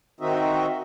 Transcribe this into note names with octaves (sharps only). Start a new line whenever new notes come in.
D#3 C4 D#4 F#4 D#5 E5